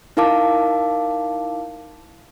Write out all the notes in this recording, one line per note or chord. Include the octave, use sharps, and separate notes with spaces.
D#4 E4 A#4 F5 A5 D6